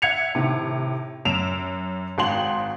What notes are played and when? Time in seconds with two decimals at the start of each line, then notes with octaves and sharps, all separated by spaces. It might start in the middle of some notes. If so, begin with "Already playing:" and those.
0.02 E5 F#5 G#6 C#7 F7
0.35 A2 C3 D#3
1.25 F#2 D7 E7 F7
2.18 G#1 F#4 G5 C6 F#7